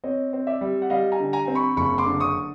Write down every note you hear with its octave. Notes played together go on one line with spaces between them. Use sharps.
C4 C#5 D#5
C4
D5 E5
G3
F#5
G3 D#5 F5
G#5 A#5
D3
G#5 A#5
C4
B5 C#6
F#1 B5 C#6
C6 D6
D3
C#6 D#6